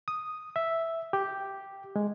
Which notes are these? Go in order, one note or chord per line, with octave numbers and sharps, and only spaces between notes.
D#6
E5
G4
G#3